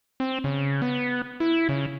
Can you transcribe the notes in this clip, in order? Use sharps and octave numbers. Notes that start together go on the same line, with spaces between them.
C4
C#3
B3
E4
C#3